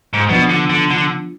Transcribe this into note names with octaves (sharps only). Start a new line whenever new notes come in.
G#2
B2 F3 B3 D4
D3
D3
D3